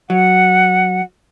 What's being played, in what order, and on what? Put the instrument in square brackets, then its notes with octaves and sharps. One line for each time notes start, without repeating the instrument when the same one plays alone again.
[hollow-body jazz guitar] F#3 [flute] F#5